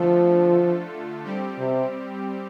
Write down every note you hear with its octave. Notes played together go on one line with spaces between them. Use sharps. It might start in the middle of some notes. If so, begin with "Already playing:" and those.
Already playing: D3 F3 A3 F4 A4
G3 C4 G4
C3